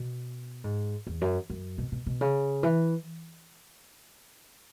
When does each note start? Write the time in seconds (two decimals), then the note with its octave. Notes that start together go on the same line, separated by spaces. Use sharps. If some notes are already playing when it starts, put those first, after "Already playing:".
Already playing: B2
0.64 G#2
1.07 E2
1.21 F#2
1.50 F#2
1.78 B2
1.92 B2
2.07 B2
2.21 C#3
2.63 E3